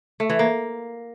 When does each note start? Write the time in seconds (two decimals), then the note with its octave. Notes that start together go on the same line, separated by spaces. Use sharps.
0.20 A3
0.30 E3
0.39 A#3